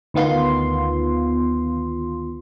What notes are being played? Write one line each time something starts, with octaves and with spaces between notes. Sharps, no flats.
D2 D#3 B3 F4 C6